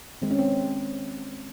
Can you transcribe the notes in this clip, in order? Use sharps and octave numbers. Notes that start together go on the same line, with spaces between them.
D#3 G#3 C4
C#4
C4